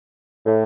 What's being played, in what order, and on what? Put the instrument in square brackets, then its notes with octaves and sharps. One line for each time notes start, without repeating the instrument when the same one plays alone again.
[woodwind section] A2